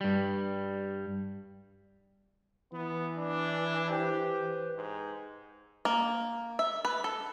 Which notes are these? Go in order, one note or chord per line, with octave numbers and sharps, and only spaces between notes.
G2 G3
E3 B3
D4
G4 B4 C5
G#2
A#3
E5
B4
A4